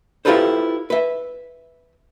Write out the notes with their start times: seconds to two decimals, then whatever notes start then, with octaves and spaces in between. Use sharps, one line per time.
0.25 E4 F4 G4 A4 B4 C5
0.90 B4 E5